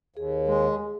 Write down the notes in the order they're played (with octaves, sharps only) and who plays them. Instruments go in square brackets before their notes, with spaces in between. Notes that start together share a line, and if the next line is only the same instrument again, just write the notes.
[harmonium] D#2 [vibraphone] G#4
[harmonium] G#3